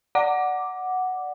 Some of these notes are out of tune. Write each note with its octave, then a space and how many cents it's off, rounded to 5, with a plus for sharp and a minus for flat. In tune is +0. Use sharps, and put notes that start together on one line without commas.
D5 +0 F#5 +0 D6 +0